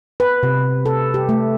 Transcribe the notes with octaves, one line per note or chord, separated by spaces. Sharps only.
B4
C3
A4
G4
A3